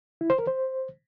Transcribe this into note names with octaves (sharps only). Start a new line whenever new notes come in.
E4
C5
A#4
C5